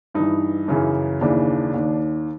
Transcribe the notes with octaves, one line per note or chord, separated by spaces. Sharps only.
G2 E3 D#4
F#2 C#3 E3
D#2 C#3 E3 D4
D#2 D#3